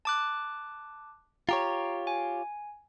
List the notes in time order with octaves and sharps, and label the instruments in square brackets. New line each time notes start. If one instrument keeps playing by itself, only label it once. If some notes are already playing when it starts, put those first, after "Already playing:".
[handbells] A5 D6 F#6
[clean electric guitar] F4 G4 C#5 [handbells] A#5
[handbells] G#5